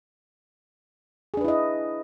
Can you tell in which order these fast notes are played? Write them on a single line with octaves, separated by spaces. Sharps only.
G#4 D4 B4 E4 D#5